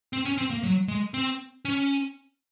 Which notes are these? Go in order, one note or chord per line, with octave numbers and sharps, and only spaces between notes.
C4
C#4
C4
A#3
F#3
G#3
C4
C#4